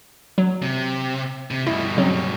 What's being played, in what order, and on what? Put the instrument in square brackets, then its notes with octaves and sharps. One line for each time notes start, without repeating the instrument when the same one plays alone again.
[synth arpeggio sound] F#3
[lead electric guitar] C3
C3
[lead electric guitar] G2 B2 [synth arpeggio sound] E4
[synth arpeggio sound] C#3 F#3 C4